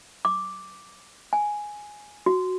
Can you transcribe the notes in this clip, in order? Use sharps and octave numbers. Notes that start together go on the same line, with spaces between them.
D6
G#5
F#4